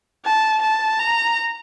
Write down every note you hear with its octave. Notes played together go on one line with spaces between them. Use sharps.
A5
A5
A#5